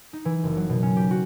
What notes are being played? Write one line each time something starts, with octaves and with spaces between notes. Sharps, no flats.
D#4
E3
F#1
F#3
B2
C#4
G4
F#4